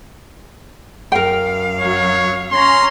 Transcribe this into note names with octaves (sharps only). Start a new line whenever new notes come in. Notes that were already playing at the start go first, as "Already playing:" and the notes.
F#2 A#4 F5 G5
F#3 C#5
C#4 A#5 C6